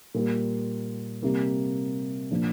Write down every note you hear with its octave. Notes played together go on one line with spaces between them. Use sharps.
A#2 G3 A#3
C3 G3 A#3
A#2 F3 A#3 D4